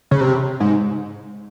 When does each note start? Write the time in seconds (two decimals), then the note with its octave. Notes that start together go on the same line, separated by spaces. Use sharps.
0.11 C#3
0.21 C3
0.60 G#2